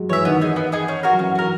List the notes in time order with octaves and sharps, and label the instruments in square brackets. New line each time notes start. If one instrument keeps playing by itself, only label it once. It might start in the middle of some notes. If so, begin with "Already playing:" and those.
Already playing: [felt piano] F#3 G#3
[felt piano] E3 [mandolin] C#5 E5
[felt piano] D#3 [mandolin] B3
[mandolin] D#4 G#4
B3
D#4 G#4
C#4
F#4 A#4
[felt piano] F#3
[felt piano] E3 [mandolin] C#4
[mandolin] F#4 A#4